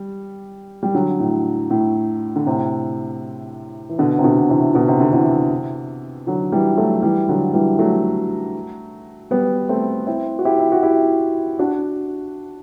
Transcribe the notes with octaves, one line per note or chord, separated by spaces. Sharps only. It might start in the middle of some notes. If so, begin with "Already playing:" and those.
Already playing: G3
G3
D3 F#3
A2
A2
D3
A2 C3
E3
B2 D3
C3
B2 D3
C3 E3
B2 D3
C3
D3
C3 E3
D3 F#3
E3 G3
F#3 A3
E3 G3
D3 F#3
E3 G3
F#3 A3
G3 B3
A3 C4
C4 E4
F#4
E4 G4
E4
F#4
E4 G4
D4 F#4